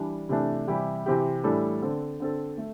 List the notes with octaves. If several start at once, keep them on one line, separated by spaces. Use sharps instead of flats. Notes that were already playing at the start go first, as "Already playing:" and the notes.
Already playing: E3 G3 D4
C3 E3 A3 D4
C3 E3 G3 E4 G4
C3 E3 C4 G4
A2 E3 G3 D4 A4
D3 C4 A4
D3 C4 A4
A3